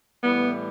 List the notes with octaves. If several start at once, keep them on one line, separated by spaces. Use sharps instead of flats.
A2 E3 G3 B3